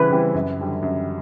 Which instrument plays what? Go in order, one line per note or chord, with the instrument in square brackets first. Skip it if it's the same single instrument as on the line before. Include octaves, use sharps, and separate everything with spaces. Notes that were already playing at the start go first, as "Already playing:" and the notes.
Already playing: [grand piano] C#3 E3 G3 C4 E4 [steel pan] B4
[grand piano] E3 G3 C4 E4
F#2
D3 G3
F#2